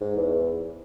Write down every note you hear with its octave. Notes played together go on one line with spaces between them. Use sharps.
G#2
E2